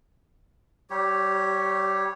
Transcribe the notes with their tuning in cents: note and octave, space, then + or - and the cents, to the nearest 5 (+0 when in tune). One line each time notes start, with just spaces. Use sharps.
G3 -30 G4 +0 C#5 -5